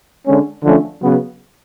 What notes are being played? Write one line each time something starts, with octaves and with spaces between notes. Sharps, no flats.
D3 G#3 C#4
D3 F3 A3 C#4
C#3 F#3 B3